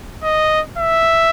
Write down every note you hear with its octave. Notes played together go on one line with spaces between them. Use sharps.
D#5
E5